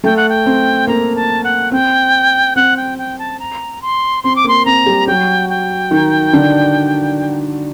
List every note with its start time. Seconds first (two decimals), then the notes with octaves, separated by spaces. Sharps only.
0.04 A3 A4 G5
0.17 F#5
0.29 G5
0.46 C4
0.87 A#3 A#5
1.16 A5
1.44 F#5
1.71 C4 G5
2.56 C4 F#5
2.77 G5
2.98 G5
3.19 A5
3.40 A#5
3.82 C6
4.24 C4 C6
4.36 D6
4.44 A#3 C6
4.65 C4 A#5
4.86 G3 G4
5.07 F#3 F#4 G5
5.49 G5
5.91 D#3 D#4
6.33 D3 D4